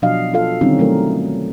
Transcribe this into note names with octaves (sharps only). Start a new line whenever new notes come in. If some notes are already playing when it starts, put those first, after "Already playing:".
B2 F3 F#3 D4 D#5 F5
F4 A4 F5
D3 D#3 G3 C4 C#4 D#4
B2 F#3 A3 A#4